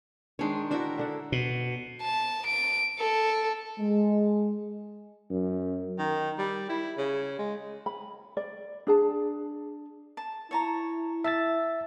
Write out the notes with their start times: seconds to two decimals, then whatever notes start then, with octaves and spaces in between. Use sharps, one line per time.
0.39 D#3 G#3 D4 C5 C#5
0.71 D4 E4 F#4 A#4 C5
0.98 D3 D4 F#5
1.32 B2
2.02 A5
2.46 D7
2.99 A4
3.79 G#3
5.30 F#2
5.99 D#3
6.39 G3
6.70 E4
6.98 C#3
7.39 G#3
7.86 B5
8.37 D5
8.87 D4 G#4 A5
10.17 A5
10.51 E4 C#5 A5 A#5
11.24 E5 A5 E6 A6